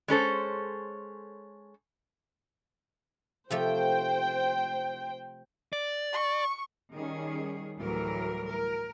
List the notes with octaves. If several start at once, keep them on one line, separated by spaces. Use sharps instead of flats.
G#3 C#4 A4 C5
C3 F3 A3 C5 G5
D5
C#6
D#3 G3 C#4 G#4
D2 A2 E3 F#3 G3 A#4
A#4